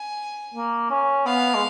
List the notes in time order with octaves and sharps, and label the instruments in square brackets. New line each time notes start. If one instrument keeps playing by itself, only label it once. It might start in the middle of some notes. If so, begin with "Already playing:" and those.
Already playing: [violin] G#5
[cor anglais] A#3
C#4
[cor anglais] B3 [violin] F5
[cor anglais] G#3